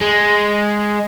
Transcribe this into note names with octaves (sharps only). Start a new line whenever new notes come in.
G#3